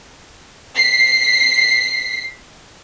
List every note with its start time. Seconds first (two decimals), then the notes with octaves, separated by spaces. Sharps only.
0.74 B6 C7